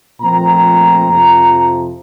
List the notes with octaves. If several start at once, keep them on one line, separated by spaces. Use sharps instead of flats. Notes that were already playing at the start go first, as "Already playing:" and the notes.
A#2 F3 A3 C4 A#5
F2 C3 F3